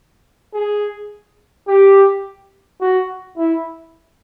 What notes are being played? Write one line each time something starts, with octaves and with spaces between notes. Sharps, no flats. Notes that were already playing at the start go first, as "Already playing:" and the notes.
G#4
G4
F#4
E4